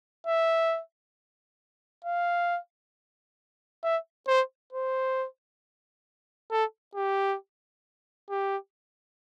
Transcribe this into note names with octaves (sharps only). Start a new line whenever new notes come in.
E5
F5
E5
C5
C5
A4
G4
G4